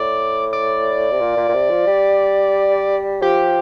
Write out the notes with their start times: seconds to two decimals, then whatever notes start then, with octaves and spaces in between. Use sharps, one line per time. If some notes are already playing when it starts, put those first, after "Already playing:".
Already playing: A2 D5
0.53 D5
1.11 C3
1.20 A#2
1.37 A#2
1.49 A#2
1.54 C3
1.70 F3
1.87 G3
3.22 F3 G4